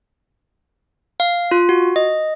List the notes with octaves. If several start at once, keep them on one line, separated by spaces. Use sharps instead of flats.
F5
F4
F#4
D#5